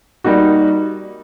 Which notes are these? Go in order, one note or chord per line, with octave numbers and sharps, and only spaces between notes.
G3 A#3 D#4 F#4